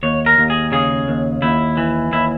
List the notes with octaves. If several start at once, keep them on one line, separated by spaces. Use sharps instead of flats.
D#2 C#5
A#4
D#2
G#4
C#3 G#4
D#2
D#2 E4
E3
D#2 E4